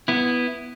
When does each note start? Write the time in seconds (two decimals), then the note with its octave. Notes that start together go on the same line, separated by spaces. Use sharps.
0.08 B3 E4